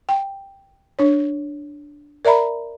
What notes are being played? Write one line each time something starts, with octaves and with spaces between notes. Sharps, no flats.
G5
D4 C#5
A#4 D5 E5 A#5 B5